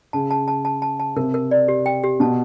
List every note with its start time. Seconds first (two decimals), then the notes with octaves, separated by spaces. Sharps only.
0.13 C#3 A5
0.31 A5
0.48 A5
0.65 A5
0.82 A5
1.00 A5
1.16 C3 A#4
1.34 A#4
1.51 D5
1.68 G4
1.86 G5
2.04 G4
2.20 B2 A5